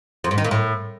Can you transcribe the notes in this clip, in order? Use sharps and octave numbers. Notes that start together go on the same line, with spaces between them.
F2
G#2
D#3
A#2
A2